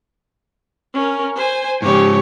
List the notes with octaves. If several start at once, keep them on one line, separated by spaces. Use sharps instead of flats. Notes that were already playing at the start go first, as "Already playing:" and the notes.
C#4 A#4
C5 G#5
G#2 C#3 G4 C#5